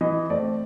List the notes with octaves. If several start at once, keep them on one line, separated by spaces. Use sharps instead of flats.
E3 D#5
A3 C4 D5